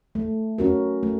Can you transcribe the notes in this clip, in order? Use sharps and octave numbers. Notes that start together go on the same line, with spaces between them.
A3
C#4 F#4 A#4
A3